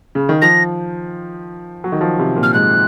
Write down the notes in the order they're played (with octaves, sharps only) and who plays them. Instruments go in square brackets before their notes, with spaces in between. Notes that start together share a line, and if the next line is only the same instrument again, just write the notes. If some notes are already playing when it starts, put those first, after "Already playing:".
[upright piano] C#3
D#3
[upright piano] F3 [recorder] A#6
[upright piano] F#3
D#3
F3
C3
A#2
[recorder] F6
[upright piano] G#2 [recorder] F#6